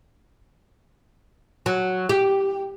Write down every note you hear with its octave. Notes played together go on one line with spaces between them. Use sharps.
F#3
G4